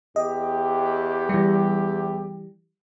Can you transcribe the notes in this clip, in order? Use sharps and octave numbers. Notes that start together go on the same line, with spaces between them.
E2 G4 D#5
E3 G3